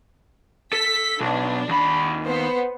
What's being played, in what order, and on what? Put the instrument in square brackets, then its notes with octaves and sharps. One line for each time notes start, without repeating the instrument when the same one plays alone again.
[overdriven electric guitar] A4 [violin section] B6
[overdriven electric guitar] B1 [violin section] D4
[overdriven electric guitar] D#2 B5
[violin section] B3 C5